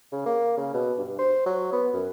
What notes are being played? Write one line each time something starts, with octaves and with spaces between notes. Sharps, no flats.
C#3
A#3
C#3
B2
G2
C5
F#3
B3
F#2